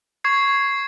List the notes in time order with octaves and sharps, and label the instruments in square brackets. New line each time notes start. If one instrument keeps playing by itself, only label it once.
[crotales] C#6 G#6 C7